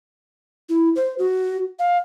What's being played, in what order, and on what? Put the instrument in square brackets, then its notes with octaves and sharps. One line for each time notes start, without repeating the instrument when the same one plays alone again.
[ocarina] E4
C5
F#4
F5